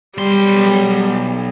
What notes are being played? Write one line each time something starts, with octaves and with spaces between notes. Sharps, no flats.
B1 G3 C6